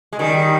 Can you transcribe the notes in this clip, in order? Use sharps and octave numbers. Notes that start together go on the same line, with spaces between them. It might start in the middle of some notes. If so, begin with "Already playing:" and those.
G#3
D#3 G3